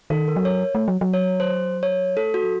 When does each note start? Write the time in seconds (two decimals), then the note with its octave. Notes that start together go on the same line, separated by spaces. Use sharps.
0.10 D#3 A4
0.28 A#4
0.36 F#3
0.45 C#5
0.75 A3
0.88 F#3
1.01 F#3
1.13 C#5
1.40 C5
1.83 C#5
2.17 A3 A4
2.34 F#4
2.44 F#3